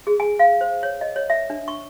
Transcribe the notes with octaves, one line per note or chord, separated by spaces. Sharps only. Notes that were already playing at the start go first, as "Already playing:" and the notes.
G#4
G#5
F5
C5
C#5
D#5
C#5
E5
D4
C#6